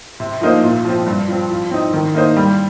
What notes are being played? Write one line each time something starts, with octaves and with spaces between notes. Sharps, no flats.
C3
F3 A#3 D#4 C5
A#2
F3 C4
G2
F3 C4
F3
C4 D#4
D#3
A#3 D#4 C5
G3